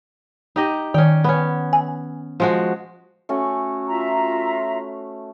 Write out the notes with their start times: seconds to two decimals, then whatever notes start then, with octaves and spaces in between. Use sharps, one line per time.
0.56 D#4 G4 D#5
0.94 D#3 C#4 G5
1.24 B3 C#4
1.73 G#5
2.40 F3 G#3 F#4
3.29 A3 C#4 F#4
3.88 F4 E5 A#5